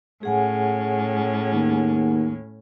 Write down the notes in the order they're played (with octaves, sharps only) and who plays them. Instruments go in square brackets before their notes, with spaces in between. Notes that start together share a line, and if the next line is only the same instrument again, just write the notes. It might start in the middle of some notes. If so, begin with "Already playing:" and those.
[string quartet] A2 C#4 [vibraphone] G#4 F#5 G#5
[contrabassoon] D#2